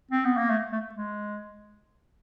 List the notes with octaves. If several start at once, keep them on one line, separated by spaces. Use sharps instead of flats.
C4
B3
A#3
A3
A3
G#3